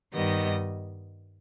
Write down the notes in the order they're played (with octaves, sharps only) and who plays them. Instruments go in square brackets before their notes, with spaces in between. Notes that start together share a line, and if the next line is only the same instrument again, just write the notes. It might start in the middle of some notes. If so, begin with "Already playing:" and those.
[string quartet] G2 D#3 G3 B3 D#5